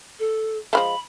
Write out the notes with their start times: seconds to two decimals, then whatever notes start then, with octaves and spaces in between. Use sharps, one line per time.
0.19 A4
0.73 F3 G#3 A3 B5